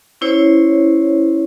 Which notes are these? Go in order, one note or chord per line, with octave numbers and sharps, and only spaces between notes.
C#4 E4 C5 C#5